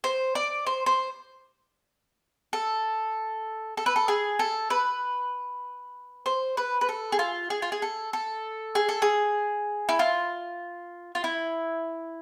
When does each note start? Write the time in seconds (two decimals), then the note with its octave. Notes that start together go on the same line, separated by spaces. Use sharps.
0.04 C5
0.35 D5
0.67 C5
0.86 C5
2.53 A4
3.77 A4
3.86 B4
3.96 A4
4.08 G#4
4.39 A4
4.70 B4
6.26 C5
6.57 B4
6.81 B4
6.89 A4
7.12 G#4
7.19 F4
7.50 G#4
7.62 F4
7.72 G#4
7.82 A4
8.13 A4
8.75 G#4
8.89 A4
9.02 G#4
9.89 E4
9.99 F4
11.15 F4
11.24 E4